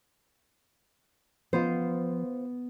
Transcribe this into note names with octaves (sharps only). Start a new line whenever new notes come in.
F3 B3 F4 C5